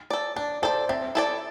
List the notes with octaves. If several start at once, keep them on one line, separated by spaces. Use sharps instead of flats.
A4 D5
D4 D5
A4 C5 D5
C4 E5
E4 A4 D5